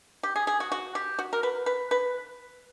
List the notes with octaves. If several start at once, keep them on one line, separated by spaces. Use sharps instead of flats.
G4
G#4
G#4
F#4
F#4
G4
F#4
A#4
B4
B4
B4